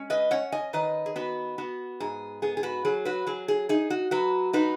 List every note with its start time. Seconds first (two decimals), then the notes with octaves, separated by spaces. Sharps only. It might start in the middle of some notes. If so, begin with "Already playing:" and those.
Already playing: G#3 C#4
0.10 B4 D#5
0.31 C#4 C#5 F#5
0.52 D#5 G#5
0.73 D#3 B4 D#5
1.06 G#4
1.16 B3 F#4 B4
1.58 B3 F#4
2.00 G#2 G#4
2.42 B3 G#4
2.57 G#4
2.63 F#4 B4
2.85 F#3 G#4
3.05 F#4 B4
3.27 F#3 G#4
3.48 G#4
3.69 D#4 G#4
3.90 F#4
4.11 F#3 F#4 B4
4.53 D#4 F#4 B4